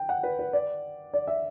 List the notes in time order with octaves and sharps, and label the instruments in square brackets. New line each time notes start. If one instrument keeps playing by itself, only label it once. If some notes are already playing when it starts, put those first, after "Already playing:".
Already playing: [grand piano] G5
F#5
B4
B4
D5
D5
E5